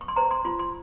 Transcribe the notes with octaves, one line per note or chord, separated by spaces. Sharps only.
C#6
C6
C5 A#5
C6
F4 C6
C6